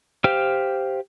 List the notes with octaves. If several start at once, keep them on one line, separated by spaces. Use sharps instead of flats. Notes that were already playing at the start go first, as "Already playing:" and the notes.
G4 C5 F5 G5 F6